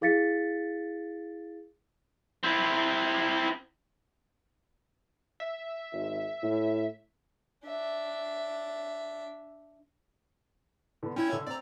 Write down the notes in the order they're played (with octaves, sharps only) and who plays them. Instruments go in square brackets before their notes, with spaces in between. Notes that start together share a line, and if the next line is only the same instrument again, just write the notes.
[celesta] E4 G#4 F5 A6 B6 C#7
[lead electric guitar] C4 E4
[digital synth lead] E5
[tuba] G#1
A2
[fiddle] D4 E5
[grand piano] D3 B3
[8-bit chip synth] C#4 E4 G#6 [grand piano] G5
[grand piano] D3 E6
[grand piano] C4 [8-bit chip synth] D5 A#5